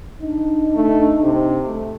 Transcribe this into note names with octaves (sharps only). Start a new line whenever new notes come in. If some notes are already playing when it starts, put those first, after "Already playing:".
D4 D#4
A3
C3
A3